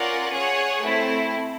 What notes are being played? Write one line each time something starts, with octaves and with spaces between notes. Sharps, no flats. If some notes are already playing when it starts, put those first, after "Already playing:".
Already playing: C#4 F4 A#4 D5 F#5
G#4 C#5 F#5
A3 C4 E4